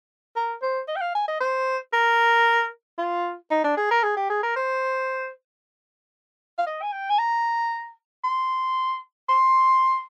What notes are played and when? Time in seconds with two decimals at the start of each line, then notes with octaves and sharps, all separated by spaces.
0.36 A#4
0.62 C5
0.88 D#5
0.96 G5
1.01 F5
1.15 G#5
1.28 D#5
1.41 C5
1.93 A#4
2.98 F4
3.51 D#4
3.64 D4
3.77 G#4
3.91 A#4
4.03 G#4
4.17 G4
4.30 G#4
4.43 A#4
4.56 C5
6.58 F5
6.66 D#5
6.83 G#5
6.92 G5
7.10 G#5
7.18 A#5
8.24 C6
9.29 C6